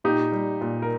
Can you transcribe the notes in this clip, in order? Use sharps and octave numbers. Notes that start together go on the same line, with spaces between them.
A#2 D#4 G4
G3
A#2
A#4